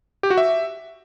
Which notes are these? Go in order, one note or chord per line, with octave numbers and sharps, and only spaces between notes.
G4
F#4
E5